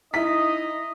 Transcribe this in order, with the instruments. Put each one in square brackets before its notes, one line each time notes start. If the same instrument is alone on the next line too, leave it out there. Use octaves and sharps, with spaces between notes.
[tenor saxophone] D#4 [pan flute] E4 [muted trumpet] D#5 [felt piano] E5 B6